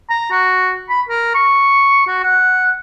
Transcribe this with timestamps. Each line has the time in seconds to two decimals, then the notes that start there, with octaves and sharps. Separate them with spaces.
0.10 A#5
0.31 F#4
0.89 B5
1.09 A#4
1.35 C#6
2.07 F#4
2.24 F#5